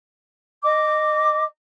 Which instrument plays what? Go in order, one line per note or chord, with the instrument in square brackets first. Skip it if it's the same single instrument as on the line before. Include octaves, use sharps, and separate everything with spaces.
[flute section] D#5 D6